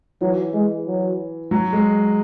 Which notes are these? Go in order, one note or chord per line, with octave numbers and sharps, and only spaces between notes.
E3 F#3
G#3
F#3
F#3
G#3